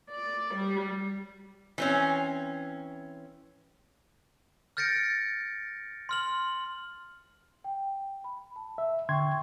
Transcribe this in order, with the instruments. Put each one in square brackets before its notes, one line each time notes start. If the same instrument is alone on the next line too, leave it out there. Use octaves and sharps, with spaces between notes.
[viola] D5
G3
[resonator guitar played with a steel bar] E3 C4 C#4
[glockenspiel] F6 G6 A6 A#6 C#7 D7
C6 F6 F#7
[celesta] G5
B5
A5
[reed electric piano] E5
[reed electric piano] D3 C6 G#6 [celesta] E5 G5 C#6